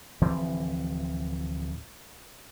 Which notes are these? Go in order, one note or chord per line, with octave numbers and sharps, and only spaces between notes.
D1 E3 F3 C4